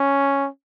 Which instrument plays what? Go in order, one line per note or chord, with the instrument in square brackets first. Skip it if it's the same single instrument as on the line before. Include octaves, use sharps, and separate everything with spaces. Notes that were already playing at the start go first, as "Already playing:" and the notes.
Already playing: [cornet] C#4